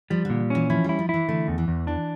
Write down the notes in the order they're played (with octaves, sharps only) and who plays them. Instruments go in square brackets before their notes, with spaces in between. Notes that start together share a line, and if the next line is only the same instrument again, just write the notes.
[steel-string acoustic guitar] F3 [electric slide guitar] G3
[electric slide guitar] A#2 [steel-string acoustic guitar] D3
[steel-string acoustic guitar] E3 [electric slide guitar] C#4
[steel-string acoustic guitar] F3 [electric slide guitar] E4
[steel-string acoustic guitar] G3 [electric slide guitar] E4
[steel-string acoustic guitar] F3
[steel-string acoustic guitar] E3 [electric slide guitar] E4
[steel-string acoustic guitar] D3 [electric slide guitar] A3
[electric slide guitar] E2
[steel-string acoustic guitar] E3
[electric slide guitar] E2
[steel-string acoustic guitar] E3 [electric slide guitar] D4